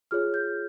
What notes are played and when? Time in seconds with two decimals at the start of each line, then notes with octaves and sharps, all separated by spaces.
0.11 F4 G#4 C#5 F6
0.34 G6